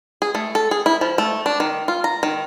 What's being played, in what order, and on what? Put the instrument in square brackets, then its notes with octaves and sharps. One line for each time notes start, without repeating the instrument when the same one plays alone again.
[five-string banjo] G#4
A3
A4
G#4
E4
F3
A3
D4
D#3
F4
A#5
D#3